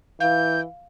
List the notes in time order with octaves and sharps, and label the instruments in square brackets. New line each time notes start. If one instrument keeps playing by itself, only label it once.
[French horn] E3 [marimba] F5 [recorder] G6